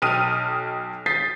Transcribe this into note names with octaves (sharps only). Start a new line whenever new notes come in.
B1 G5 D#6 F6 D#7
D#6 G6 A6 B6 C7